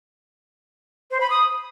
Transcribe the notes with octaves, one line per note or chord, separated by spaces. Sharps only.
C5
B5
D#6